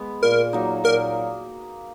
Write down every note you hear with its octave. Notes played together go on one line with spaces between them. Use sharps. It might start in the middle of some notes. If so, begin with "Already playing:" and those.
Already playing: G#3 B3
A#2 A#4
F#3 A#3 D#4
A#2 A#4